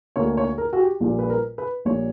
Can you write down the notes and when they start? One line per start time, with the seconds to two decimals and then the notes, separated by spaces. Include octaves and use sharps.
0.16 D2 D3 A#3 C#5
0.37 C#5
0.58 A#4
0.73 F#4
0.80 G4
1.00 A#1 A#2 G3 A#3
1.19 B4
1.30 A#4
1.58 B4
1.85 A#1 A#2 G3 A#3 C#5